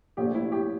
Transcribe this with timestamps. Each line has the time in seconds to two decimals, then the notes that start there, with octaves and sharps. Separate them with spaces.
0.17 A#1 A#2 A3 G4
0.35 E4
0.52 G4